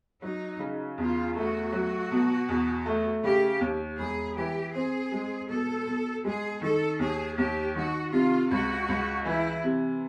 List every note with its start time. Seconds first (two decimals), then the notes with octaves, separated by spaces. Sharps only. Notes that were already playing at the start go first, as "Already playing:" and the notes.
0.22 F#3 D#4
0.59 C#3
0.98 E2 F4
1.35 A3 F#4
1.72 F#3
2.11 B2
2.49 E2
2.86 A3
3.24 C#3 G4
3.60 D#2
3.98 E1 G#4
4.36 E3 G4
4.74 C4 G#4
5.12 G#3
5.49 B2 A4
5.87 B2
6.24 G#3 G#4
6.62 D#3 A4
6.99 D#2 G#4
7.37 D#2 G4
7.76 D#3 F#4
8.12 C3 F4
8.50 C#2 F#4
8.89 C#2
9.25 E3 E4
9.63 C3